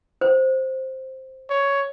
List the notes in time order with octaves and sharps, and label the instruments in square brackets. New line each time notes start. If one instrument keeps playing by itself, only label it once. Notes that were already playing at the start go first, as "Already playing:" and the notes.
[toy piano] C5
[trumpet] C#5